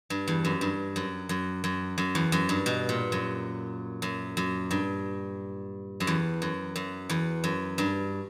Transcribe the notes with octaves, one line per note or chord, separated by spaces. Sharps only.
G2
E2
F#2
G2
F#2
F#2
F#2
F#2
E2
F#2
G2
B2
A#2
F#2
F#2
F#2
G2
F#2
E2
F#2
F#2
E2
F#2
G2